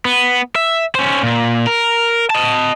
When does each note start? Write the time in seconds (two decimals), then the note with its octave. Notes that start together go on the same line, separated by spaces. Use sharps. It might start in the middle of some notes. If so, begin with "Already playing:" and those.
0.05 B3
0.55 E5
0.95 C#4 C5
1.23 A#2
1.67 A#4
2.30 D#5 A5